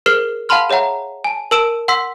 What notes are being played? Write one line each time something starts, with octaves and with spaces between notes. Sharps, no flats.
G#4 A#4 C5 F6 C7 G7
F5 F#5 A5 B5 C6 F6
G#4 C#5 E5 F#5 A#5
G#5 A5
A#4 A5 E6 D7 E7
F#5 C6 E6 B6